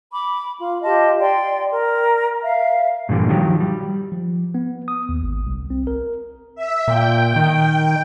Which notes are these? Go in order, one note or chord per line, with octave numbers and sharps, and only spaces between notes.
B5 D6
F4
F4 G4 D#5 A5
D5 G5 C6
A#4
E5 F5
G2 A#2 D3 E3 G3
D#3 F3 F#3 G4
G3
F3
B3
D#6
D#2
G#1
C2
C4
A#4
E5
A#2 G5
D#3